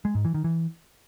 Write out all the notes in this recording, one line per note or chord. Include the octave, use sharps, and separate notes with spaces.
G#3
G#2
E3
D#3
E3